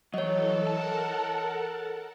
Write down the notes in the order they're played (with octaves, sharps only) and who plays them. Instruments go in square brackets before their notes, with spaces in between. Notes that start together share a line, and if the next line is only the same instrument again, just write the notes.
[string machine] E3 A4 [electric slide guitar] F#3 [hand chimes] C#5 D#5
[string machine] A4 A#4 F#5 [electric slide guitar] A5